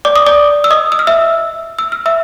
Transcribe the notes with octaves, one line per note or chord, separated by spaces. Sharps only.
D5 D6
D#6
D5 D6
E6
D#5 D#6
E6
F6
E5 E6
E6
F6
E5 E6